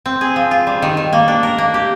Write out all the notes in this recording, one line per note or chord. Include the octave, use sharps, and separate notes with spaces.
C4
G#4
F3
F4
G3
D#3
D#3
A#3
D4
A#4
A#3
G4